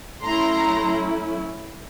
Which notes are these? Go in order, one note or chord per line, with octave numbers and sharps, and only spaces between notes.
F#3 A3 C#4 E4 A#5 C6